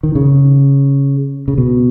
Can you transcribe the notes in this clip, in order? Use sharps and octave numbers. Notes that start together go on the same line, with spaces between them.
D#3
C#3
C#3
B2